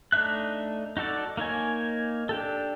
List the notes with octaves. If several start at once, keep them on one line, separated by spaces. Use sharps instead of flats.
A3 D4 D#4 E5 F#6
D#4 F#4 A4 D5
A#3 D#4 C#5 G#5
D4 G4 A4